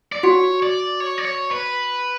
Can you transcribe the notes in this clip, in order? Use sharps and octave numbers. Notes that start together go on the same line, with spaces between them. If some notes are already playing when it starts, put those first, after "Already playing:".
D5
F#4 C#5
D5
C#5
D5
C#5
B4